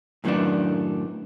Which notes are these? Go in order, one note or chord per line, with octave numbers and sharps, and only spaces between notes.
F#2 A2 D#3 F#3 B3 D4